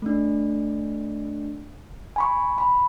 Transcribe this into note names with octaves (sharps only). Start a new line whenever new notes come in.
A3 D4
G#5 B5 C#6
B5